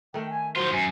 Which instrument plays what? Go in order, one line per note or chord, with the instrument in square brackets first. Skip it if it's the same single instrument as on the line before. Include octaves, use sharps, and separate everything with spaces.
[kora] D#3 A3 [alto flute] G5
[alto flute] G#5
[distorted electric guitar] D#3 F4 [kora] F#3 G5 [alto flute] C5
[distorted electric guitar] F#2 [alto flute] G#5